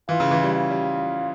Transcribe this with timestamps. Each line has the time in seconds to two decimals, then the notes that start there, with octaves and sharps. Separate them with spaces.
0.09 E3 F4
0.20 C#3
0.31 E3
0.43 G3
0.54 F4
0.70 G3